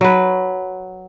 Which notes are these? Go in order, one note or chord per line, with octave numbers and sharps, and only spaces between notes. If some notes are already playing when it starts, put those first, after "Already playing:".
F#3 B4